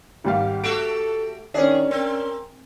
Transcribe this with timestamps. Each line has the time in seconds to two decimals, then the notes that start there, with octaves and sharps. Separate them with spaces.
0.25 G#1 G3 G4 F5
0.64 A3 F#4 G4 A4 D7
1.54 D#3 C#4 D4 G#4
1.91 C4 A#4